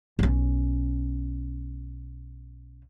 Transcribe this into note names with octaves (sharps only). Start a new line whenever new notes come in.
B1 C#4